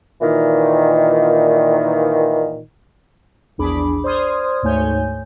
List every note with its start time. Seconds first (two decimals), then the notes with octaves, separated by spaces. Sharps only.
0.22 A#2 D#3 E3
3.58 A#1 E2 D4 G#4 B5 D6
4.04 C5 D5 C6 D#6 F6 G#6
4.63 D2 G#2 A3 C#5 G#5 G6